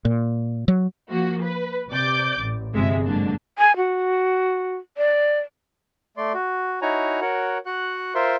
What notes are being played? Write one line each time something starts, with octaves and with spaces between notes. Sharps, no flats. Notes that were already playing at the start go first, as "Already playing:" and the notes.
A#2
F#3
F3 A#3 F#4
B4
C3 D5 D6 G6
A1
G1 F2 C3 G#3 E5
G#2 D3 F#3 A#3 D4
G#5
F#4
D5
A3 D5 C6
F#4
D#4 E4 F#4 C#5 G#5 A#5
F#4 A#4 C#5 F#5
F#4 F#5 F#6
F4 A#4 C5 E5 C6